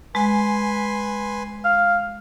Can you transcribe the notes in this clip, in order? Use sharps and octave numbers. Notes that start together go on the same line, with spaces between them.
G#3 B4 G#5 C6
F5